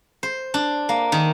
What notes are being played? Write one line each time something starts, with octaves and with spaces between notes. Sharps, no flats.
C5
D4
A#3
D#3